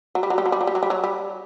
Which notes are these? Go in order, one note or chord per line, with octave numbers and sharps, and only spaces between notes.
F#3
G3
F#3
G3
F#3
G3
F#3
G3
F#3
G3
F#3
G3